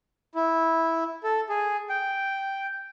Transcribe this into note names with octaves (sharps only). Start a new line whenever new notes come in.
E4
A4
G#4
G5